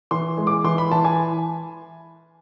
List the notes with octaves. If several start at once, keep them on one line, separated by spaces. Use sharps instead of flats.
E3 C6
G#3
D6
E3 C6
B5
E3 A5
G#5